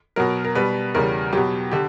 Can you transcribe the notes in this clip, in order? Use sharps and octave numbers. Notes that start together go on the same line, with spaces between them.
B2 F#3 A#4
A#4
B2 G3 B4
E2 C#3 G3 A#4
B2 F#3 G4
D3 G4